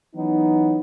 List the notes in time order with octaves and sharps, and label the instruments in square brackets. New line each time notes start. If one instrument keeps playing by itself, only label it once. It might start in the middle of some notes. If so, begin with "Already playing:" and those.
[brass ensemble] E3 F#3 B3 C#4 D#4